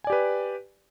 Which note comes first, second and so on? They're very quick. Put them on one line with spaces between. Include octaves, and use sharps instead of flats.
G#5 D5 G4 B4